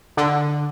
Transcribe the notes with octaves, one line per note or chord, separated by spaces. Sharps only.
D3